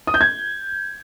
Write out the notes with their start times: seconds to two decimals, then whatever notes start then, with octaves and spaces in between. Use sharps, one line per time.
0.07 D#6
0.14 G6
0.21 G#6